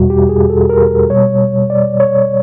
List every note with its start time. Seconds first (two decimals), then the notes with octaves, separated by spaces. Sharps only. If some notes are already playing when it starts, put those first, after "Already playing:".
Already playing: E2 B2 G3 F#4
0.10 G4
0.29 G#4
0.50 A4
0.69 A#4
1.10 B2 G3 C#5
1.70 D5
2.00 C#5